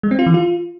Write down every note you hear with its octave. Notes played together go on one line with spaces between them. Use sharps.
G#3
C4
F4
E3
F4